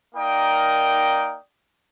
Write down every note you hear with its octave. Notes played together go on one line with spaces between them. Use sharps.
A#3 D#4 A#4 D5 G5 D#6